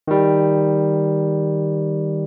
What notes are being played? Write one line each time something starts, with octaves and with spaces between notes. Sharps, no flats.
D#3 G3